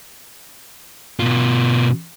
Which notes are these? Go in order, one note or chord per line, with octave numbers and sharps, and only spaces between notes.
B2 F4